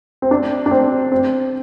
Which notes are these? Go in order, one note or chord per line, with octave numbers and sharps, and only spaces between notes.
C4
D4
D4
C4
C4